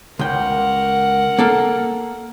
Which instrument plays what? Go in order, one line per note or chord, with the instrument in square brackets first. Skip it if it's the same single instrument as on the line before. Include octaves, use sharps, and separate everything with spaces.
[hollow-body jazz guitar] C#2 G5 [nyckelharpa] A#4 F#5
[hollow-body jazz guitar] A#3 A4 F5